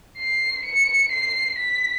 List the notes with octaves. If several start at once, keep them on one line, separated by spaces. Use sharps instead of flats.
C7
C#7
C7
B6